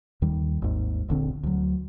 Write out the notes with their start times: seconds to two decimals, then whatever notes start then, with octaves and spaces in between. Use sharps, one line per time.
0.22 D#2 D#3 G3
0.62 G#1 D#2 G#2
1.08 D#1 A#1 D3 C4
1.43 D2 F#3